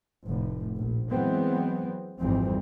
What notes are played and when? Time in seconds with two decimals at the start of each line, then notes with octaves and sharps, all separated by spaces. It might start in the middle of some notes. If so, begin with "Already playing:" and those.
0.25 F1 A2
0.77 A#1
1.09 E3 F#3 G#3 B3 C4
2.20 G#1 F2 E3 G3 C4